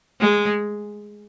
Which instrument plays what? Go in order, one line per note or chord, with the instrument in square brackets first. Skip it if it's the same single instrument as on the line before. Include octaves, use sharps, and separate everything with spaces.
[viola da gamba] G#3